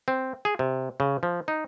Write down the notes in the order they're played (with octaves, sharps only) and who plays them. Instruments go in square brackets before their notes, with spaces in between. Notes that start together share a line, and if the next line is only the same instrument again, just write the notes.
[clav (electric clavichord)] C4
G#4
C3
C#3
F3
D#4